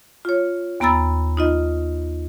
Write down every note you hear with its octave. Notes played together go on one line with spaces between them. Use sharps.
F4 C#5
D#2 B3 A#5 B5 E6 A6
D#4 F4 D#5